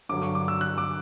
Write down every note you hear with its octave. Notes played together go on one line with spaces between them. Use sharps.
G2 D3 F#3 D6
C#6
D6
E6
F#6
D6